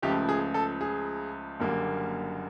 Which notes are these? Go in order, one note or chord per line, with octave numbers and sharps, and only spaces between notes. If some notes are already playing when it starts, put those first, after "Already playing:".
C#2 C#3 F3 A3 G4
G#4
A4
G#4
F#1 F#2 D3 G3 A#3